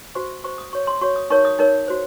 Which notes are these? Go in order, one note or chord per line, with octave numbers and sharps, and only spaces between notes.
F#4 C5 C#6
F#4 C5 C#6
D#6
F#4 C#5 C#6
C6
F#4 C#5 C#6
D#6
D#4 A#4 C#5 C#6
D#6
D#4 A#4 C#5
F#4 C5